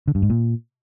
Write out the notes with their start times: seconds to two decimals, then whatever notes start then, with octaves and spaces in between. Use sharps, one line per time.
0.08 D3
0.15 G2
0.22 G#2
0.30 A#2